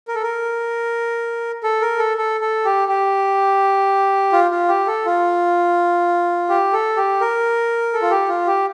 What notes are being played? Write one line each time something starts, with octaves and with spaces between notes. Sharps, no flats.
A#4
A4
A#4
A4
A#4
A4
A4
A4
G4
G4
F4
F4
G4
A4
F4
G4
A4
G4
A#4
A4
F4
G4
F4
G4